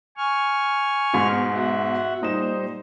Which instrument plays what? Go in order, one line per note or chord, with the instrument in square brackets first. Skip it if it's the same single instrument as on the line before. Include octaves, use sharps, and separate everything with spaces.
[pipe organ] G#5 C#6 F6
[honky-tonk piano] G#2 B2
[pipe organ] F#4 E5 F#5
[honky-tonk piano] A#2 D#4 E7 [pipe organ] G3 C5